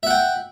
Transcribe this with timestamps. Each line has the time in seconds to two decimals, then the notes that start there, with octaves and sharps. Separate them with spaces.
0.03 E5
0.07 F#5
0.10 G5